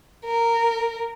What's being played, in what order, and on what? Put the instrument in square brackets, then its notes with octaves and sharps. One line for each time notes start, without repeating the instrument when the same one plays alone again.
[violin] A#4